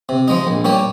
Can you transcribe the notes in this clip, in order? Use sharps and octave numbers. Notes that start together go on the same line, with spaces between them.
C3
F3 G#3 D#4
A#1
A#2 G3 C#4 G4